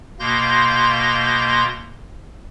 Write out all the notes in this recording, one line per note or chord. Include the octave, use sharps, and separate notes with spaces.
B2 A#3 C6 G6 A#6